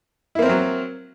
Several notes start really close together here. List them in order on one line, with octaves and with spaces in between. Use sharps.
E4 A#3 C4 A#4 F#3